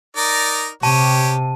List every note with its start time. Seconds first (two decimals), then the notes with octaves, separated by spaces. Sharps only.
0.17 D#4 A#4 D5
0.83 C3 G4 C#5 A5